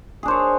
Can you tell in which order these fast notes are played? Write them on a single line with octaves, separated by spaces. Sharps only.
G#4 D4 C5 C#5